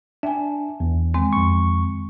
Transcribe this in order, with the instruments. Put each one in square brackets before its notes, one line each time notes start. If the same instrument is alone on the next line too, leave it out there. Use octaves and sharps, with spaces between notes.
[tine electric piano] D4 [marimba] E5 G5 G#5
[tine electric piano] E2
[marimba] D#3 G#3 C4
[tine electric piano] F2 C#6